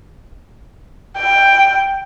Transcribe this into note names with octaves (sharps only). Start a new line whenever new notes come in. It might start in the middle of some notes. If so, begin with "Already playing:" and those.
G5